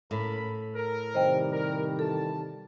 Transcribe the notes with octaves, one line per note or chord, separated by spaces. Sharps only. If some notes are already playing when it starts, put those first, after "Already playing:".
A2 C#3 A#4 B5
A#4
C3 D#3 G3 C5 D#5 G5
A#4
E3 A4 A5